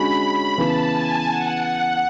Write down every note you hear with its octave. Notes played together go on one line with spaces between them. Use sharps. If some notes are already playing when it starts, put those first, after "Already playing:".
Already playing: D3 G#3 C#4 F#4 B5
C#3 E3 B3 A5
G#5
F#5